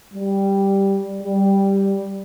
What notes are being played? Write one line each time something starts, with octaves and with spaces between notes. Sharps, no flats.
G3
G3